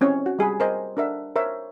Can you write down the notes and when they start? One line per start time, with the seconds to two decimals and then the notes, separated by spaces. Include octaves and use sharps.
0.01 C4 C#4 E4 C#5
0.26 F#4
0.39 G3 G#4 G#5 B5
0.60 A#4 C5 D#5 G#5
0.97 D4 A#4 E5 F#5
1.36 A#4 C5 C#5 E5